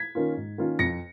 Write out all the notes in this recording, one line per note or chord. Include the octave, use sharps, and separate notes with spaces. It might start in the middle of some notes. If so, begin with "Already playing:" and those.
Already playing: G#6 B6
D#3 A#3 C#4 F4
G#2
D#3 A#3 C#4 F4
F2 A#6 C#7